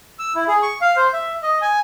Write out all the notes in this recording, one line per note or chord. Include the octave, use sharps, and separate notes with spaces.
E6
E4
G#4
C#6
F5
C5
E5
D#5
G#5